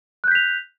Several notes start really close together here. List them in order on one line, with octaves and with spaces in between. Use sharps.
F#6 G6 B6 F7